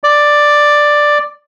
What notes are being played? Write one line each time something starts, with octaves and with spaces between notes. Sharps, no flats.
D5